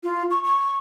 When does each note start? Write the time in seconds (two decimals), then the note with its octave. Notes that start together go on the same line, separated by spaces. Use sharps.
0.04 F4
0.31 C#6
0.44 C#6